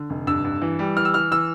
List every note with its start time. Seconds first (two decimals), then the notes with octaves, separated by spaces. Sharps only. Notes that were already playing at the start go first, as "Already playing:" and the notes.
Already playing: D3
0.10 F1
0.27 G2 E6
0.44 G2
0.62 E3
0.79 G3
0.97 E3 F6
1.05 E6
1.14 E3 F6
1.31 E3 E6